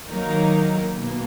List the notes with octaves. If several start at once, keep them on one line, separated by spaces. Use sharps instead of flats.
D#3 F#3 A#3 D#4 A#4
B2 A#3